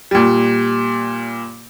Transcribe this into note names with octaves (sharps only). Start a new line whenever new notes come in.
A#2 G3